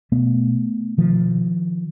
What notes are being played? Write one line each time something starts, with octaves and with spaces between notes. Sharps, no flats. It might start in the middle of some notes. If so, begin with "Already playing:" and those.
B2 A3 B3
B2 D#3 F3